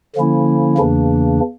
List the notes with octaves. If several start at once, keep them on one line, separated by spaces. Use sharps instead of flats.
D3 F3 A#3 C#4 E4
E2 C#3 E3 A#3 D4